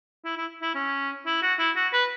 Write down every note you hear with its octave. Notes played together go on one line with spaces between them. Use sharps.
E4
E4
E4
C#4
E4
F#4
E4
F#4
B4